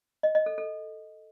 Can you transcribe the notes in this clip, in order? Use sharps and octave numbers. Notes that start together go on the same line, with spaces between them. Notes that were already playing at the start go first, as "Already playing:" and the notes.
D#5
D#5
A4
A4